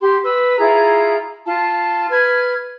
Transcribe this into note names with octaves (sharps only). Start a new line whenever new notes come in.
G4 C6
B4 E6
E4 F4 G#4 A#5
F4 A5
B4 F6 G#6